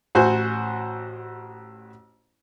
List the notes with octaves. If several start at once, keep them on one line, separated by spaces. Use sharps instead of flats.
A1 F#4 C5 G#5